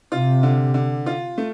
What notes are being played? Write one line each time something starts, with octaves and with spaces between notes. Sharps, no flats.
C3 F4
D3
D3
F4
A3